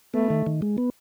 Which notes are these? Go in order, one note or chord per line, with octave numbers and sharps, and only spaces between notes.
A3 B3
D#3
D#3
G#3
B3